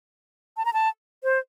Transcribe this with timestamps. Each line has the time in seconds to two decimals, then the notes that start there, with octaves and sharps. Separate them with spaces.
0.57 A5
0.65 A#5
0.73 A5
1.24 C5